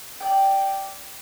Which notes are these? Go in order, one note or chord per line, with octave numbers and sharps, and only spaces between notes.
D5 G5